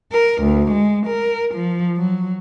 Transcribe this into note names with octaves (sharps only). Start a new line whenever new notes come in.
A#4
D2
G#3
A#4
F3
F#3